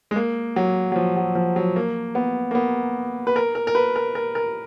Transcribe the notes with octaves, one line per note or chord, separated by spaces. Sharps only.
G#3
A#3
F#3
F#3
F3
F#3
F3
F#3
A#3
B3
A#3
B3
B4
A#4
A#4
A#4
B4
A#4
A#4
A#4